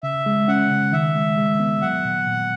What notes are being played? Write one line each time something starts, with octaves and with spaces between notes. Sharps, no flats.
C#3 E5
G#3
C#4 F#5
C#3
D#3 E5
G#3
G#3
B3
F#3 F#5
A#2
A#2